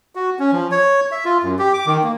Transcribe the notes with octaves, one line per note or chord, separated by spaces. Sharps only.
F#4
C#4
F3
C#5
E5
F4
F#2
G4
D6
D#3
A#3